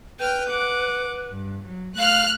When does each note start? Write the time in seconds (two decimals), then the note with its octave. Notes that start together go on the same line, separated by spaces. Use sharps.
0.19 B4 G5 F6 G6
0.49 F#5 D6
1.31 G2
1.66 F#3
1.98 A3 F5 F6 F#6